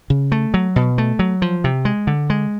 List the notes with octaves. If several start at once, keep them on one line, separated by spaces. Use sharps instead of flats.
C#3
A3
F#3
B2
A3
F#3
F3
C3
G#3
D3
G#3